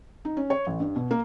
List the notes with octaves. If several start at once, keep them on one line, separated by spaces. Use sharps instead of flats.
D#4
C#4
C#5
A1
G2
B2
A#3